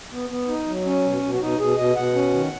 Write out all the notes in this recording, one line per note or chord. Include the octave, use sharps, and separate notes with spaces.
B3
B3
D#4
F#3
C#4
B2
B2
F#4
B2 D#4
B2 G#4
B2 D#5
B2 F#5
C#4
D#3